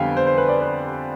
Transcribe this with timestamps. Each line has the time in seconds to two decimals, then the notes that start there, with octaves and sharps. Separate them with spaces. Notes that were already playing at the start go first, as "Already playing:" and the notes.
Already playing: F2 D3 G3 B3 F5 G5 G#5
0.17 C5
0.27 C5
0.38 B4
0.48 D5
0.61 B4